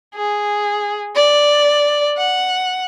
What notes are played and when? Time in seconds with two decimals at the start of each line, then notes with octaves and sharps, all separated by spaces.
0.15 G#4
1.16 D5
2.17 F#5